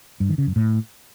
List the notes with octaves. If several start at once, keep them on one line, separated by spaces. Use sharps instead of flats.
G2
D#3
C#3
F#2
A2